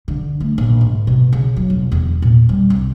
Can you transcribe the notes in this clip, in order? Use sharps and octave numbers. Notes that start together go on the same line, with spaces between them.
D3
A3
A#1
G#2
B2
C#3
F#3
E1
E2
A#2
G3
C2